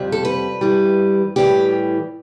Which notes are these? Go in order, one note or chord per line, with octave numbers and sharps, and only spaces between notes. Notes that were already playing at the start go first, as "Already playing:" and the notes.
Already playing: F2 C3 G3
A4
B4
G2 E3 G3
A2 E3 G3 G4